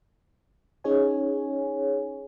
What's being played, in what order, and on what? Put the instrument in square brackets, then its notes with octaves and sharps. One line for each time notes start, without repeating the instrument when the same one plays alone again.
[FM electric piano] C#4 D#4 G#4 C#5 G#5